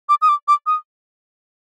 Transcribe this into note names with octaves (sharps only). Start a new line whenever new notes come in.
D6
D#6
D6
D6
D#6